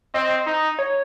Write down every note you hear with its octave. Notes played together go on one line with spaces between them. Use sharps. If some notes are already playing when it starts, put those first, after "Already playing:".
C4 D#5
D#4
C#5